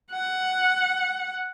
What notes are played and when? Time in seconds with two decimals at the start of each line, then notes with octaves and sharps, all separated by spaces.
0.11 F#5